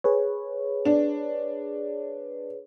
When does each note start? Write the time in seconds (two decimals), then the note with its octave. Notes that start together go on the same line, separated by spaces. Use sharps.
0.04 G#4 B4 C#5
0.85 D4